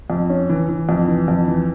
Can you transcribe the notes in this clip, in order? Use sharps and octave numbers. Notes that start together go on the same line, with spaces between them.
F2
C#4
E3
E3
F2
E3
F2
E3